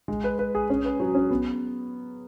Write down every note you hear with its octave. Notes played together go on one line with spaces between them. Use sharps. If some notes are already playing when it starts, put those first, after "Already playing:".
G#3
B4
B4
G#4
C#4
B4
F#3
C#4
B3